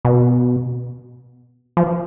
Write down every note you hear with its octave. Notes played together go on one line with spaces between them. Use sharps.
B2
F3